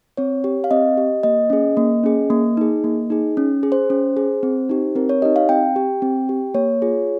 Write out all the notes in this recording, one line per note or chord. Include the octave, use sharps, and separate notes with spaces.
C4 C#5
G4
F5
C4 D#5
G4
A#3 D#5
C#4 G#4
A#3
C#4 G#4
A#3
D#4 G#4
A#3
D#4 G#4
C#4
G#4
C5
C#4
G#4
C4
D#4 G4
C4 A#4
C#5
D#4 G4 D#5
F5
C4 G5
G4
C4
G4
A#3 C#5
F4 G#4